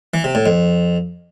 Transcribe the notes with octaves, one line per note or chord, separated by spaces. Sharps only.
E3
C3
A2
F2